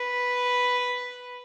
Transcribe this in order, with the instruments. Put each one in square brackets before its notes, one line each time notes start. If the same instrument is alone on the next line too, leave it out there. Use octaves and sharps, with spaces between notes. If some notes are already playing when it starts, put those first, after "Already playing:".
Already playing: [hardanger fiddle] B4